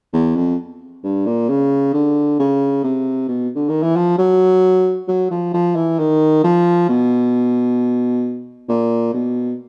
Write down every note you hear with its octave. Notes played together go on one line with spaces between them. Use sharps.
E2
F2
G2
A#2
C#3
D3
C#3
C3
B2
D3
D#3
E3
F3
F#3
F#3
F3
F3
E3
D#3
F3
B2
A#2
B2